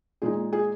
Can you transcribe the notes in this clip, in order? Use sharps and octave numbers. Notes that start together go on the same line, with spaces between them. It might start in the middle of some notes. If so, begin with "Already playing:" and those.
A#2 G#3 D#4 G#4
G#4